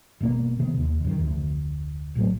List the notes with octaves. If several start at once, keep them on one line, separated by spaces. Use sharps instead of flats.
G1 B2 A#3 B3
C3 D#3 B3
D#2
F#2 D3 D#3
F1 D2
A#1 A2 F#3 A3